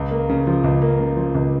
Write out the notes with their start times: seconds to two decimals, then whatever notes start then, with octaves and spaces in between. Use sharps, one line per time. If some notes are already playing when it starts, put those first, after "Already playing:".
Already playing: C#2
0.11 A#3
0.29 C#3
0.47 F3
0.64 C#2
0.82 A#3
1.00 C#3
1.16 F3
1.35 C#2